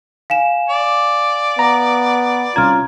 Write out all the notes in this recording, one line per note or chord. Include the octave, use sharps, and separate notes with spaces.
F5 G#5 E7
D5
B3 A#5
C2 C#4 F4 A#5 F6 G#6